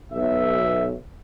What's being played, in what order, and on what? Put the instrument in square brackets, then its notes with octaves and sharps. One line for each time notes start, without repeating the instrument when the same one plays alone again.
[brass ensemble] B1 E5